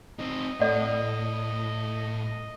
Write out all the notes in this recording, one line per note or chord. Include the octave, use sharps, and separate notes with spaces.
C4 D#4 D#5
A2 A4 D5 F#5